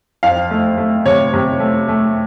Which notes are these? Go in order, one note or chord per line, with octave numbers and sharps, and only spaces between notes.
F2 F5
A3
A3
C3 C#5
C3
A3
A3